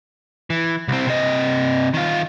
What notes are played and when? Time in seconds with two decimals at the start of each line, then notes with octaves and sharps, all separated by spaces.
0.50 E3
0.88 C2 C4
1.07 C3 D#5
1.94 D#3 F4